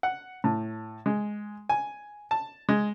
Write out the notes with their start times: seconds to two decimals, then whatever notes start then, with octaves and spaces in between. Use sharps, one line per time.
0.03 F#5
0.44 A2
1.06 G#3
1.69 G#5
2.31 A5
2.69 G#3